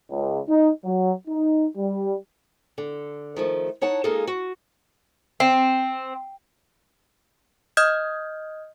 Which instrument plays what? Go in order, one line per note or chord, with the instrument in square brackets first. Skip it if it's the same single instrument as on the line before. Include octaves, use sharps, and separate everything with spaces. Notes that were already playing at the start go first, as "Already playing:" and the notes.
[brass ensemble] C#2
D#4
F#3
D#4
G3
[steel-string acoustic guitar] D3
D#3 F3 A3
D#4 C#5 F#5 A5
G#3 A#3 D#4 F4 G#4 A4
F#4
[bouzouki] C4
[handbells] D#5 D#6 F6 G6 G#6